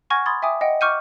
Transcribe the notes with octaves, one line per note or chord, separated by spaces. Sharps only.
F#5 G#5 C#6 F6 G#6 A#6
B5 C6 D#6 G#6 A6
E5 G5 G#5 D6 D#6
D#5 F#5 G5
C#6 D6 F6 G6 C#7 D#7